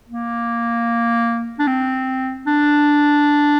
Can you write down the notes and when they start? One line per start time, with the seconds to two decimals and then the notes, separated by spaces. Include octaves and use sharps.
0.08 A#3
1.59 D4
1.67 C4
2.46 D4